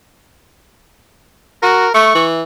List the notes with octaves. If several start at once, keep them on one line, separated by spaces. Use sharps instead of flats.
F#4 A#4
A3 C#6
E3